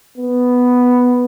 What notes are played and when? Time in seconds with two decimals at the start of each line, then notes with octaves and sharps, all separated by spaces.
0.18 B3